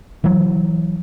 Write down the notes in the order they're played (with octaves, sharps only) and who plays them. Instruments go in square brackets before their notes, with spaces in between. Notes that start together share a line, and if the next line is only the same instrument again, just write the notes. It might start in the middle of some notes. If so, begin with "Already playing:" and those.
[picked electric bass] E3 F#3